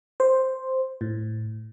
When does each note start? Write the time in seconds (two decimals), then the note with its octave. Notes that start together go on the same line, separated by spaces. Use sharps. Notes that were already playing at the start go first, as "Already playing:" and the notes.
0.20 C5
1.01 A2